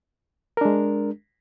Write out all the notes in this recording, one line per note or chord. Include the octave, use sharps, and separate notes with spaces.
G#3 D4 A#4